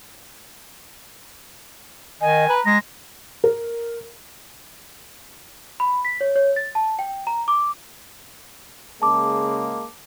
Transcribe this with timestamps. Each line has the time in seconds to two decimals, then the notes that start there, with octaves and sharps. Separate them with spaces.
2.21 D#3 D#5 G#5
2.49 B4 A#5
2.66 G#3 A#6
3.44 A#4
5.80 B5
6.05 B6
6.21 C#5
6.36 C#5
6.56 A6
6.75 A5
6.99 G5
7.27 A#5
7.48 D6
9.02 C#3 G#3 A#3 A5 D6